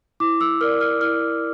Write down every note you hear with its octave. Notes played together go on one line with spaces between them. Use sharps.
E4 D6
E6
A#4 D5 F6
F6
E4 F6